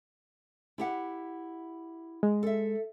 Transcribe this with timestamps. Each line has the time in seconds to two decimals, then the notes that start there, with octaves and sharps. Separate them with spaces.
0.78 E4 G4 F#5
2.23 G#3
2.43 A4 E5